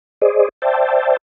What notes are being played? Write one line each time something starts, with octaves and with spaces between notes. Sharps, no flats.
G#4 C5 D5 D#5
C5 D5 E5 G5 A5